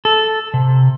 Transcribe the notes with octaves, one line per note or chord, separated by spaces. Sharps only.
A4
C3